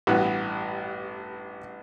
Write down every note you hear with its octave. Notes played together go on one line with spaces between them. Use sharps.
A1 G2 E3 B3 F#4